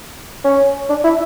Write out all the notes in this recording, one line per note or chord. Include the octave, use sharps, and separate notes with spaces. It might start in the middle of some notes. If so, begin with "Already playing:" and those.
C#4
D4
E4